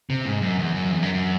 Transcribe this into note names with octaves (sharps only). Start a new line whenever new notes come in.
C3
G#2
F#2
E2
F#2
E2
F#2
F#2